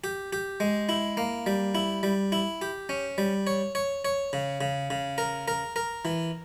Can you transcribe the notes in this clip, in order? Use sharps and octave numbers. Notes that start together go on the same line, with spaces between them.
G4
G4
G#3
E4
A#3
G3
E4
G3
E4
G4
C#4
G3
C#5
C#5
C#5
C#3
C#3
C#3
A#4
A#4
A#4
E3